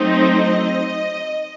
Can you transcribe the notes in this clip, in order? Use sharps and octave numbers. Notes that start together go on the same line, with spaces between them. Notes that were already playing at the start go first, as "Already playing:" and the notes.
Already playing: F#3 A3 C4 D#4
D#5